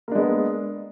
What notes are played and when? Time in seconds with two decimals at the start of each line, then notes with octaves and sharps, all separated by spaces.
0.08 A#3
0.12 D4
0.15 G#3
0.19 B3